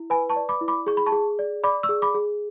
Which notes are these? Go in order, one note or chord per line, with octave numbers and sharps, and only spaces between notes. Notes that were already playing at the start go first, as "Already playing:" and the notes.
Already playing: E4
B4 G#5 B5
A5 C#6
D5
B5 D6
E4
B5 D6
G#4 C#6
B5
A5 C#6
G#4
D5
D5 B5 D6
C#6 E6
G#4
B5 D6
G#4